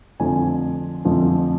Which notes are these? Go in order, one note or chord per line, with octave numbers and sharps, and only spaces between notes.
F2 D3 F3 A3 G#5
F2 D3 F3 A3